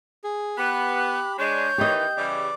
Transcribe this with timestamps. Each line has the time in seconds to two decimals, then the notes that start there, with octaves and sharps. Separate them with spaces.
0.24 G#4
0.58 B3 G4 B5 F#6
1.38 G#3 D4 C#5 G6
1.78 D#3 E3 G4 D#5
2.17 C#3 E3 G3 D5 D6